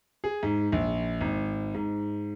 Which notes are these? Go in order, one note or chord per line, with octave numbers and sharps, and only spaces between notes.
G#4
G#2
A#1
G#1
G#2